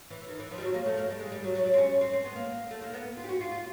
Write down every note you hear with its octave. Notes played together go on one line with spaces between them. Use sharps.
E3
D#3
E3
F3
G3
F#3
A#3
A3
A#3
G3
G#3
G3
F#3
F#3
G3
C4
C#4
C4
C4
B3
A#3
A3
A#3
B3
F4
G4
F#4
F4
F4